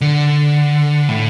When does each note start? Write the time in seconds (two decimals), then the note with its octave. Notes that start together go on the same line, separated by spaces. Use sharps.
0.01 D3
1.09 A2